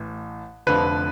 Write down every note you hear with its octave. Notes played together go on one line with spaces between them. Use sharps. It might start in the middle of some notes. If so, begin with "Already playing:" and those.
Already playing: A1 A2
F1 F2 D3 F3 B4